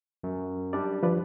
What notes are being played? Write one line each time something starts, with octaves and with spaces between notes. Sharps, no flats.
F#2
G3 D4 D5
F3 B4 D5